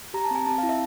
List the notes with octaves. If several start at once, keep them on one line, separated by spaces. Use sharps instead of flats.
G4 A#5
A5
C4 G#5
C4 A5
F5
E4
E5